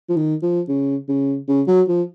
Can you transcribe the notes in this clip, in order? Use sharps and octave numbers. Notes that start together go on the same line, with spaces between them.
F3
D#3
F3
C#3
C#3
C#3
F#3
F3